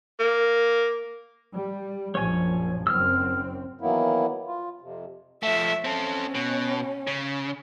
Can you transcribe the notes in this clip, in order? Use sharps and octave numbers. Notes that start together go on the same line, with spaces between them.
A#3
G3
A#1 F#2 F3 C#5 G#5
F#1 F#2 C4 E6 F6
D#3 E3 F#3 A#3 B3 E4
F4
F2 C3
F3 A3 E5
C4 C#4 A4
B2
C#3